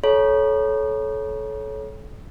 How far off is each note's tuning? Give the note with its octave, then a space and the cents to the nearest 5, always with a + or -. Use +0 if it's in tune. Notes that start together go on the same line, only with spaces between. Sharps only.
A4 -30 C#5 +0 A#5 +40